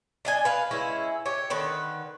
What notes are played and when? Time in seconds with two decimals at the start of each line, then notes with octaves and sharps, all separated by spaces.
0.25 D4 D#5 G#5
0.45 B4 F5
0.71 G#3 C#4 E4
1.26 G4 C#5
1.50 D3 D#3 B4